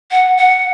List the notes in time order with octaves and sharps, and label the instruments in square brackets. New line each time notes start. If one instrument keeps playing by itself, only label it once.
[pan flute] F#5
F#5